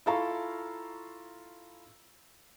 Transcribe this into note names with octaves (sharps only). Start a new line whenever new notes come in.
E4 F4 A4 F5 A#5 C#6